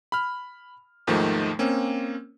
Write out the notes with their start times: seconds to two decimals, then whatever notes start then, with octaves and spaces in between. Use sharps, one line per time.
0.12 B5 F6
1.07 D#2 G#2 D#3 F3 A3
1.59 A#3 C4 C#4